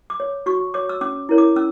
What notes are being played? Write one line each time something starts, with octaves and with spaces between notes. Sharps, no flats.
D6
C#5
F#4 C#6
C#5 D6
E6
C#4 D6
E4 A#4 C#5
D6
C#4 E6